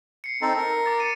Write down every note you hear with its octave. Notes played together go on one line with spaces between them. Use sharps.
C7 C#7
C4 D#4 A4
A#4
D6 A6
A6 C#7 D#7